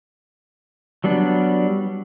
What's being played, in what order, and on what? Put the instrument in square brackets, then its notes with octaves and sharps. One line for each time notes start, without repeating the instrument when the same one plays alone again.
[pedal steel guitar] F#3 G3 B3 D4